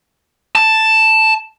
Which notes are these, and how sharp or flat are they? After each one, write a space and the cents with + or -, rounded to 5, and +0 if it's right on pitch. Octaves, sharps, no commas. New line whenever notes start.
A5 +5